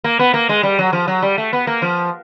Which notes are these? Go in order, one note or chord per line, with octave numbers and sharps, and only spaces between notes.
A#3
B3
A#3
G#3
G3
F#3
F3
F#3
G3
A3
B3
A#3
F3